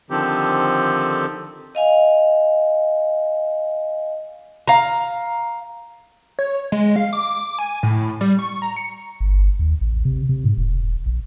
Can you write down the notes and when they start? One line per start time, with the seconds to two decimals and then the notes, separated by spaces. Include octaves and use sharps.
0.10 D3 D#3 F3 C4 G4 A4
1.75 D#5 F5 G#5
4.68 F5 A#5
6.39 C#5
6.72 G#3
6.96 F5
7.13 D6
7.59 G#5
7.83 A2
8.21 G3
8.39 C#6
8.62 A#5
8.76 C#7
9.20 G1
9.59 D#2
9.81 A1
10.05 C3
10.29 C3
10.44 G#2
10.57 E1
11.06 A#1